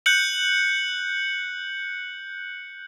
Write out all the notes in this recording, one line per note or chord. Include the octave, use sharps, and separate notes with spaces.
F#6 G6 C#7 F#7